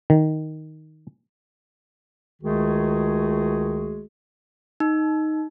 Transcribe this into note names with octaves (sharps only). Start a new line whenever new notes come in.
D#3
C#2 D#3 G#3 A3 F#4 G#4
D#4